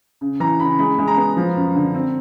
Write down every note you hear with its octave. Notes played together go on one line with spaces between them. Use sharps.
C#3
E3 A#5
C#3 B5
G#3 B5
G#3
A#5
B3
F3
F#2
D3
C4